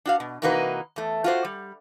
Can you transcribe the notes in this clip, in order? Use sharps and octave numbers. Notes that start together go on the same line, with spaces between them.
D4 F#4 F5
B2
C3 E3 A#3 D#4 F#4 B4
E2 A3
F4 F#4 C5
G3